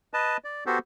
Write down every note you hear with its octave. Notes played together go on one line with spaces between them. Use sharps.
B4 D#5 A5
D5
B3 F#4 G4 A4 C5